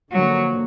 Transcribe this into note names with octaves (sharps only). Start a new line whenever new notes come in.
D3 F3 F#3 A#3